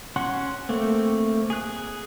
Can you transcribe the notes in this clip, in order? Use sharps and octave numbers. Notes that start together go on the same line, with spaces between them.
C#4 F#4 F#5 C6 F#6
A3 A#3 C4
G#4 F#6